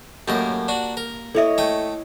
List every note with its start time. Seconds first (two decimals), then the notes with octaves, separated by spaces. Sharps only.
0.28 F#2 A2 A#3 G4 D#5 A5
0.68 D4 F#4
0.97 A#4
1.35 E4 A4 C#5 D#5 E5
1.58 A3 G5 D#6